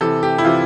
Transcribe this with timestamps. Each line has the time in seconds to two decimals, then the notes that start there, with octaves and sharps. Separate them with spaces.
0.01 C3 E3 A4
0.23 G4
0.38 E4
0.45 C3 E3 F4